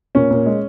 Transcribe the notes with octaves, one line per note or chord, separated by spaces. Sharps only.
A#2 C#4
A#2
G#3